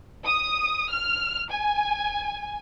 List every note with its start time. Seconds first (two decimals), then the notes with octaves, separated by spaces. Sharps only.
0.25 D#6
0.90 F6
1.52 G#5